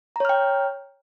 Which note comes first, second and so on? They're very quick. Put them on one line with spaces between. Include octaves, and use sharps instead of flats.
A#5 C#5 F6 G5